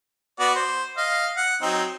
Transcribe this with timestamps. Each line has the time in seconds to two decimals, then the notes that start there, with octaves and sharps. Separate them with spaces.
0.40 B3 F#4 D5
0.56 C5
0.97 D#5 F5
1.37 F#5
1.62 F#3 C4 D#4